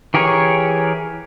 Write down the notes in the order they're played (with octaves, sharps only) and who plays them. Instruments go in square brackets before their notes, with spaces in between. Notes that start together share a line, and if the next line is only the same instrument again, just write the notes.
[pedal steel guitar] E3 G4 G#4 A#4 C#5